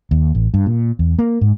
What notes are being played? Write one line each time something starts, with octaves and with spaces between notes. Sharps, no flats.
D#2
A1
G2
A#2
E2
A#3
G#2